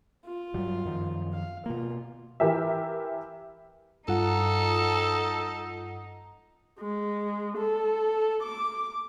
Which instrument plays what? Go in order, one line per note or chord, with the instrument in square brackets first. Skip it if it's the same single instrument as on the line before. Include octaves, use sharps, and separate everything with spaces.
[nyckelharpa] F4
[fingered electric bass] G2 F#3 G3
F#2 D#3 F3
[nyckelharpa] F5
[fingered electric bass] B2 A#3 [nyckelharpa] F4
[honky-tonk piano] E3 G4 A#4 E5
[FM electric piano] G2 F4 F#5 [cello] D#4 [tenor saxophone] A4
[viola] G#3
A4
D6